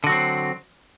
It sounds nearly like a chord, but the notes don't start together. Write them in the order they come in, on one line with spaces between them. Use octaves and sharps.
D3 F#4 F#3 C4